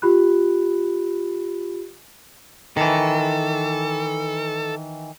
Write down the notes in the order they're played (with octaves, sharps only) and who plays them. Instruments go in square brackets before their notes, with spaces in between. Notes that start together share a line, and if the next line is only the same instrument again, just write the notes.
[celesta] F4 G4 B5 F#6
[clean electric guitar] D#3 E3 [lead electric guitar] A4